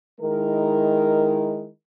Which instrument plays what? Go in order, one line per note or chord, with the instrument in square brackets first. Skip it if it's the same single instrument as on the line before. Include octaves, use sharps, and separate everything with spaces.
[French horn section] D#3 G#3 E4 A#4